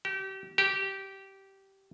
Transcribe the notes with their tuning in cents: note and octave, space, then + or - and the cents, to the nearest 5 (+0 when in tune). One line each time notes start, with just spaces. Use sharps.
G4 -30
G4 -15